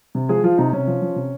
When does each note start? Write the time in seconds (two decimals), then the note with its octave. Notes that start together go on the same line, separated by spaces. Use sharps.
0.15 C3
0.29 F3 G#3 G#4
0.43 F3 F4
0.58 C3 D#4
0.73 C3 C#4
0.87 F3
1.02 F3
1.16 C3